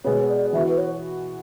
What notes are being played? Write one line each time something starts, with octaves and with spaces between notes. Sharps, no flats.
B2 G#3 B3 C#5
D5
E3 B3 F#4 E5
B4
C#5